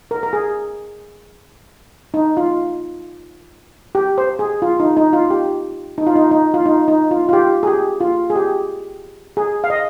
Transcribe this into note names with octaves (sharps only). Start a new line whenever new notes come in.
A#4
A#4
G#4
D#4
F4
G4
C5
G#4
F4
D#4
D#4
F4
G4
D#4
F4
D#4
D#4
F4
D#4
D#4
F4
F4
G4
G#4
G4
F4
G#4
G4
G#4
F5
D#5